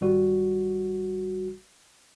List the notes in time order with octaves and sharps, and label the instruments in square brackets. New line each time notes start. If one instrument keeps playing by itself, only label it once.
[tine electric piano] G#1 G3 F#4